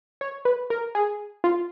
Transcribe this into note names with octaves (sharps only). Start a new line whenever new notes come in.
C#5
B4
A#4
G#4
F4